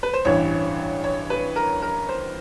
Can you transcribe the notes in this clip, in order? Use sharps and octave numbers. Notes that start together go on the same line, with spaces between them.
B4
C5
A1 G2 E3 C#5
C#5
B4
A#4
A#4
C5